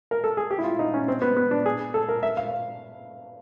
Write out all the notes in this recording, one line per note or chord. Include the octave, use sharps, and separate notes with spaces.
A#4
A4
G#4
G4
E4
F4
D#4
C#4
C4
B3
B3
D4
G#4
A4
A#4
E5
F5